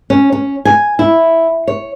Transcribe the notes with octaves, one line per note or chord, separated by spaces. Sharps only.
C#4
C#4
G#5
E4
C#5